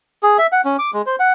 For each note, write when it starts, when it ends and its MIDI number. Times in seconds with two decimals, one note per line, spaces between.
0.23 0.37 68
0.38 0.47 76
0.52 0.61 78
0.65 0.77 61
0.79 0.91 86
0.94 1.02 56
1.06 1.16 72
1.19 1.33 78